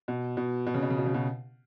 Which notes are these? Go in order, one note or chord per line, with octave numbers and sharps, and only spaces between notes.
B2
B2
B2
C#3
B2
C#3
B2
C#3
B2